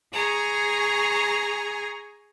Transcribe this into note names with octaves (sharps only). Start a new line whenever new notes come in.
G#4 G#5 A#5 C#6